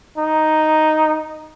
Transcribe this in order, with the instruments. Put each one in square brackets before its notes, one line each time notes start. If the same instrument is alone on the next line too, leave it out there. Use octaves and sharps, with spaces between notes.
[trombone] D#4